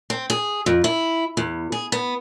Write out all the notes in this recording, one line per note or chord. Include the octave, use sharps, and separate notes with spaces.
C4
G#4
F2
E4
E2
G#4
B3